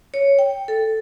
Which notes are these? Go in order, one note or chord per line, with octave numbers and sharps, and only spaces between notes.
C#5
G5
A4